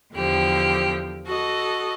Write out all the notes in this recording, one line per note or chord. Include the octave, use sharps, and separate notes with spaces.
E2 D3 F3 G4
F#4 A4 D#5